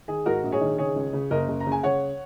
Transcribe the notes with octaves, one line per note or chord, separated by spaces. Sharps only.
D#3 G#4
G#2 F#4 A#4
A#1
G#4 C#5
D#3
C#3 G#4 C#5
C#2
C#3
F#1 A#4 D#5
F#1
A#5
C#3
G#5
C#3 C#5 F#5